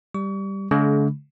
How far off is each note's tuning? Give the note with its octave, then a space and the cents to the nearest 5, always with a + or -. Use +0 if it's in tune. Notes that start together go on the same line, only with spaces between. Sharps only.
G3 +0 C#6 +40
D3 -45 G#3 +45